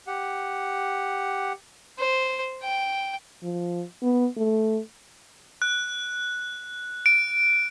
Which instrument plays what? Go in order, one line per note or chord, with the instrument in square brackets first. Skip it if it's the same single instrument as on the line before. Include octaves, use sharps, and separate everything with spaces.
[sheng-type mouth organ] G4 F#5
[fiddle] C5
G5
[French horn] F3
B3
A3
[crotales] F#6
D7